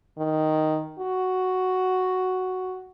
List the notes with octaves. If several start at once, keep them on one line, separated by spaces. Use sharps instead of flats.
D#3
F#4